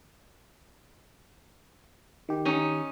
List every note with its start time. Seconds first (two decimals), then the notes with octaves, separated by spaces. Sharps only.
2.29 D#3 G4
2.45 C#4 D#4